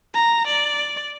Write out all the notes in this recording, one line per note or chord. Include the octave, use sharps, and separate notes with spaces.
A#5
D5